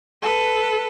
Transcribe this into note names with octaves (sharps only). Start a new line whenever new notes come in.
A4 B4